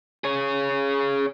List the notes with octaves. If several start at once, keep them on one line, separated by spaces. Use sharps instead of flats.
G#4 C#5